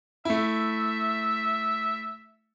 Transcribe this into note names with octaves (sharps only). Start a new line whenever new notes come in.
A3 E4 E5